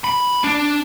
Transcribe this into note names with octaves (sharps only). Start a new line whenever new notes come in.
B5
D4